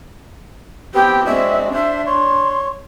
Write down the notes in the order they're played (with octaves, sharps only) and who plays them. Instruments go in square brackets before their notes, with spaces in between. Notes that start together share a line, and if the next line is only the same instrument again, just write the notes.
[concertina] B3 C4 [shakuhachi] G4 [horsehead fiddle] G5
[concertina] G#3 D4 [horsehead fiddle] C4 F#4 [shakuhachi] E5
[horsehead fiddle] D4 [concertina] C5 [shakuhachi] E5
[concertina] C#5 [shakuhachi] C6